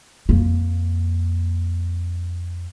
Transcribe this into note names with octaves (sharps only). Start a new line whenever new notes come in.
F2 A#3